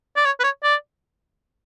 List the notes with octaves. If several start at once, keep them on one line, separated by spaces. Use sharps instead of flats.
D5
C#5
B4
C#5
D5